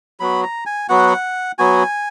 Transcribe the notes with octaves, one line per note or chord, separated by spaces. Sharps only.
F#3 B3 F#4 B5
A#5
G#5
F#3 B3 F#4 F#5
F#3 B3 F#4 G#5